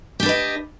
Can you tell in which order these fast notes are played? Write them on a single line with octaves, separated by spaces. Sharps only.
G4 D4 B4 D#5